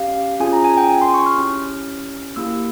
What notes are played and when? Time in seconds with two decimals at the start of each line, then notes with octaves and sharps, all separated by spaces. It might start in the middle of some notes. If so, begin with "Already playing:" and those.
Already playing: C#4 G4 F5
0.40 C#4 F4 G#4 G#5
0.53 A#5
0.64 G#5
0.77 G5
0.89 G#5
1.02 C6
1.14 C#6
1.26 F6
1.38 C#4 E4 G4 F6
2.36 A#3 E4 G4 E6